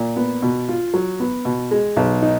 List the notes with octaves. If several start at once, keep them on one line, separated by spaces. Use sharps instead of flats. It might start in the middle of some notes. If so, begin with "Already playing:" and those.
Already playing: A#2
B3
B2
F4
F#3
B3
B2
G#3
B1
D#4